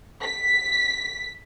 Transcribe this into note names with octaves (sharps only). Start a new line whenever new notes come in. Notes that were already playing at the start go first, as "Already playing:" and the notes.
B6